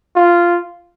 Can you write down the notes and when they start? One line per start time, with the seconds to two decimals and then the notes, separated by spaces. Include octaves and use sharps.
0.15 F4